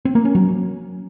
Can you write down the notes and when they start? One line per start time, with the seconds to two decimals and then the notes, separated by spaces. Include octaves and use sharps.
0.05 C4
0.15 A#3
0.25 C#4
0.35 F#3